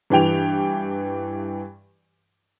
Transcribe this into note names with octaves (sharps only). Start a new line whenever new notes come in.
G2 E3 G4 G5 F7